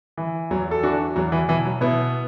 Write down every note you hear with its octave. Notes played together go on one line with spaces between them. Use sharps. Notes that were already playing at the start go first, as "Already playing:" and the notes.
E3
E2 F#3
A4
E3 D4 F#4
E2 F#3
E3
B2 E3
F#3
B2 B3 E4